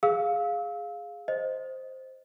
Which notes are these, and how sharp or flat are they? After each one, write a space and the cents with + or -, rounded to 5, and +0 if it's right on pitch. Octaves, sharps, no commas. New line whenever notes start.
G#4 +0 F5 +5 E6 -30
C5 +0 D#5 +0